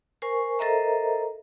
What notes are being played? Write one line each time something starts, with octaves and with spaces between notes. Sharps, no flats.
A#4 C5 G#5 C#6
A4 A#4 C5 D#5 E5 A#5